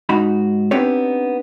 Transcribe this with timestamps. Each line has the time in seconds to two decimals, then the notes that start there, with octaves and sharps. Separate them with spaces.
0.09 G#2 D#4 F#4 B5
0.71 B3 C4 D4 D#4 G4 C#5